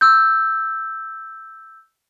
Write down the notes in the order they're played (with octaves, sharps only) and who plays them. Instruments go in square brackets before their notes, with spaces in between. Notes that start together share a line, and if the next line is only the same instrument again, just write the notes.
[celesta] E6 G6